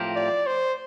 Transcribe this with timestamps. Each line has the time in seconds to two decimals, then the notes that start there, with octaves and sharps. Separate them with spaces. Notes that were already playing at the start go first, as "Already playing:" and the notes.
Already playing: A2 F3 C4 G4 A#4
0.15 D5
0.46 C5